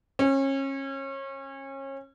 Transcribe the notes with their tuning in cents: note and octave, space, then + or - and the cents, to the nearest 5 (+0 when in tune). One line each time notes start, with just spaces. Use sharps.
C#4 -30